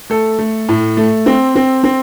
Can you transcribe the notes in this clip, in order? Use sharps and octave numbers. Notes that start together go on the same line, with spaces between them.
A3 A4
A3
A2
A3
C4
C4
C4